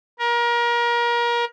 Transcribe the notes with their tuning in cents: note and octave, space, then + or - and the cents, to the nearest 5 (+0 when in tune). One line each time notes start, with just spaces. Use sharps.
A#4 +30